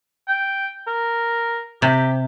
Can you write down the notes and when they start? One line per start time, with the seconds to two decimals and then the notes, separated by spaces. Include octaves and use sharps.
0.28 G5
0.87 A#4
1.82 C3 G4